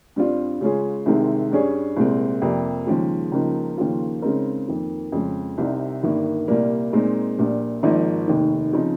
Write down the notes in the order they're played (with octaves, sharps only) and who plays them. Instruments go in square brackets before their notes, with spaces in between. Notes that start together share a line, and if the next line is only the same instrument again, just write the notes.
[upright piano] G2 G3 C4 F4
C#3 G#3 C#4 F4 G#4
C2 C3 D#3 G#3 C4
G2 G3 C#4 G#4
C2 A#2 G#3 C4
F2 C3 G3 A#3
D#2 C#3 F3 G#3
C#2 C#3 F3 A#3 D#4
D#2 C#3 F3 A#3 F4
C#3 G#3 C4 D#4 A#4
F2 D#3 A#3
F2 C#3 G#3
C2 C3 G3 C4 D#4
G1 G2 D#3 A#3
C2 A#2 G3 A#3
A#2 G#3 C4 D#4
A#1 A#2 G3
G#1 G#2 F3 A#3 D#4
F1 D#2 D#3
C#3 F3 C4 D#4 G#4